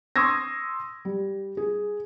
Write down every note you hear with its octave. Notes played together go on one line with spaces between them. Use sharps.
C6 C#6 D#6 E6 G#6 A#6
G3
G#4